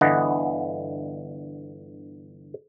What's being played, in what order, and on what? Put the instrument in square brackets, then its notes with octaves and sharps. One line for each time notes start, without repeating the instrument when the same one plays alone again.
[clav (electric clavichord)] G1 D3 E3 B3 D#5 F#5